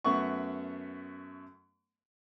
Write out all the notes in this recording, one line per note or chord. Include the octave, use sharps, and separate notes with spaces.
F#2 A3 B3 F#5 C#6